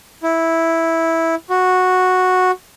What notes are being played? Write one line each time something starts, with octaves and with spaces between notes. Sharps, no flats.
E4
F#4